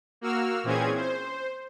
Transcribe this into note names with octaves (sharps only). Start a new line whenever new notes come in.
A#3 F#4 E6 F6
A#2 E3 C4 C#4 G#4 G#6
C5